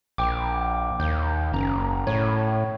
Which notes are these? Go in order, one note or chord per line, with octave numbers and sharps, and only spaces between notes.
A#1 G5 D6
D#2 G6
F#1 C#4 A#5
A2 C#5